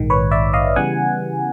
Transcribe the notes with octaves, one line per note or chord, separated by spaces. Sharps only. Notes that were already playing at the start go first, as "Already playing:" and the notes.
Already playing: A#1 G#2 D#3
B4 C#5
D5 E5
D#5 F5
C#3 E3 G3 B3 F#5 G#5